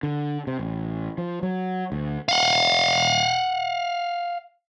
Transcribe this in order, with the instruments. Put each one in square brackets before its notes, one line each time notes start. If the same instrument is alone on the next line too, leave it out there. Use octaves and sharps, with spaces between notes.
[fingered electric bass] D3
C3
A1
F3
F#3
D2
[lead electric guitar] F5 F#5